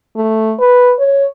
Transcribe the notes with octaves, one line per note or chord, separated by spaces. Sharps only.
A3
B4
C#5